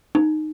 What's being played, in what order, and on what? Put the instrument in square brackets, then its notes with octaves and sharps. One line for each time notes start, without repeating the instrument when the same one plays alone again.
[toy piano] D#4